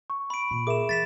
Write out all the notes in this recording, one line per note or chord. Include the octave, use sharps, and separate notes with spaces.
C#6
B5 D7
A#2
G#4 A#4 E5 D6 E7
E3 A6 B6 E7